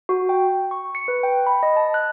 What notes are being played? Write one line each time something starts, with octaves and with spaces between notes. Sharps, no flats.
F#4
G5
C#6
C#7
B4
G5
B5
D#5
A5
F#6